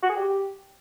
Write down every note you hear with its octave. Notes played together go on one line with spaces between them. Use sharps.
F#4
G#4
G4